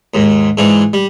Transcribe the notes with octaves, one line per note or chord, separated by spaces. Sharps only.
D#2 G#2
G#2 E3 D4
G3